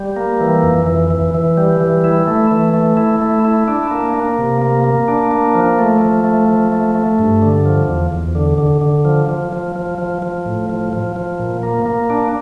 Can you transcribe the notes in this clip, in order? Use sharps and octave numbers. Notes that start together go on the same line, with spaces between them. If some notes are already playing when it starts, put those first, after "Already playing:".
Already playing: G3
A#3
E3
F2
E3
E3
E3
G3
E3
E4
A3
E3
A3
E4
A3
E4
D4
A#3
A#3
C3
A#3
A#3
D4
A#3
F3
A3
F3
A3
F3
A3
A3
G2
D3
F3
E2
E2
D3
D3
D3
F3
F3
F3
F3
F3
F3
A2
F3
F3
F3
A#2
A#3
A#3
D4